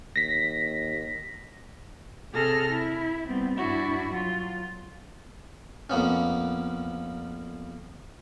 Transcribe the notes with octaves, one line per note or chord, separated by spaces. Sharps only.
D#2 A#6 B6
C3 G#4 A4 F6 A#6
E4
G3 B3 C4
G2 D4 E4 F#4
F#3 F4
F2 A#3 B3 C#4